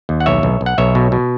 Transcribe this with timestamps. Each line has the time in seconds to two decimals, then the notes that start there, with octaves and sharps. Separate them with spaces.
0.09 D#2
0.20 F#5
0.26 B1 C#5 E5
0.43 B1
0.61 B1
0.66 F#5
0.78 B1 C#5 E5
0.95 B2
1.12 B2